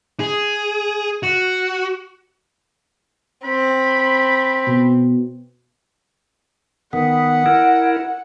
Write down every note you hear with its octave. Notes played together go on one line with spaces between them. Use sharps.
G#4
F#4
C4 B5
B2
D#3 B3 F#5
E4 A#4